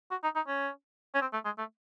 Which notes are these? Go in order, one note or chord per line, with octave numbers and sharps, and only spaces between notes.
F#4
D#4
D#4
C#4
C#4
C4
A3
G#3
A3